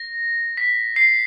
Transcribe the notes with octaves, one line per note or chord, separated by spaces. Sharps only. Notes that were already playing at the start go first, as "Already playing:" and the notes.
Already playing: A#6
B6
C7